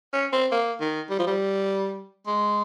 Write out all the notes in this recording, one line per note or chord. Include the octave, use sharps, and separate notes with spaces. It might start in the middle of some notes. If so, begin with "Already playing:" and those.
C#4
C4
A#3
D#3
G3
F3
G3
G#3